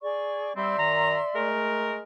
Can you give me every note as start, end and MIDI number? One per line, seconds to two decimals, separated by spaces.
0.01 0.55 68
0.01 0.55 74
0.01 0.55 85
0.56 0.74 55
0.56 0.74 60
0.56 1.48 74
0.56 1.48 76
0.56 1.48 84
0.77 1.17 42
0.77 1.17 51
0.77 1.17 82
1.34 2.01 56
1.34 2.01 57
1.34 2.01 70